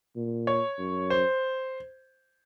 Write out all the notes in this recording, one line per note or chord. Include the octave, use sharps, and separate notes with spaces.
A#2
C#5
F#2
C5